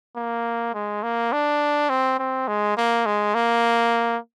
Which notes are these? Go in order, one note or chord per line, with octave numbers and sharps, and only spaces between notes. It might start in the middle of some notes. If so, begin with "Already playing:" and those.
A#3
G#3
A#3
D4
C4
C4
G#3
A#3
G#3
A#3